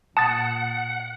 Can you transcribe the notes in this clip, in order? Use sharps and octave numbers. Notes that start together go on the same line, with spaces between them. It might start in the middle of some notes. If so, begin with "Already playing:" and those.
A#2 F#5 A5 D#6 A6